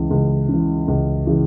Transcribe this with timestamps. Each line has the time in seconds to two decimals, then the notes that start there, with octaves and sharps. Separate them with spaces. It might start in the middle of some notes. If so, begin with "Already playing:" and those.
Already playing: C#2 C#3 E3
0.11 C#2
0.49 C#3 E3
0.88 C#2
1.27 C#3 E3